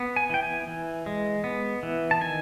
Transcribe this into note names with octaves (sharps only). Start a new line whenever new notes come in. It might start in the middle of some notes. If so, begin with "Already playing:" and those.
Already playing: B3
G#5
E3 G5
G#5
E3
G#3
B3
E3
A5
D#3 G#5